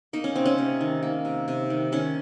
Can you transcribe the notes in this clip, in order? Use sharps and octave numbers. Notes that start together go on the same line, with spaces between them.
A#3 D#4
C#4
C3 C4
C#4
C3
D#3
A#3
C3
C3
D#3
D#3 C#4